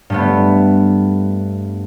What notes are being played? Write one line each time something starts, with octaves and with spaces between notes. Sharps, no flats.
G2 A3 B3